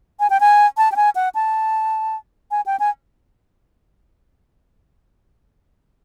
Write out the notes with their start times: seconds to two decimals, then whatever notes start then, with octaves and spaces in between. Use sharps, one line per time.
0.20 G#5
0.30 G5
0.40 G#5
0.77 A5
0.92 G5
0.96 G#5
1.15 F#5
1.35 A5
2.51 G#5
2.66 G5
2.80 G#5